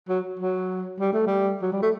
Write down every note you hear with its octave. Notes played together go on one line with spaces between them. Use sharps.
F#3
F#3
G3
A3
G3
F#3
G3
A3